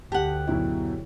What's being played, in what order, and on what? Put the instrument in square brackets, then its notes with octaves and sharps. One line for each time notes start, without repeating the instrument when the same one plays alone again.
[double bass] D2 [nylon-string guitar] G4 F#5 [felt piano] A5
[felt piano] F#2 B2 E4